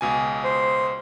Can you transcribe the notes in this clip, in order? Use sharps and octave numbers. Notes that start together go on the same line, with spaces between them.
C#2 B2 G#5
C5